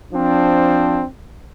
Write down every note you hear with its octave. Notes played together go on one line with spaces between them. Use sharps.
F3 C4 D4